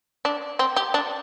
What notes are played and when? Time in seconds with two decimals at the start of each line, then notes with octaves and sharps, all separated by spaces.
0.25 D4
0.59 C4
0.76 G4
0.94 D4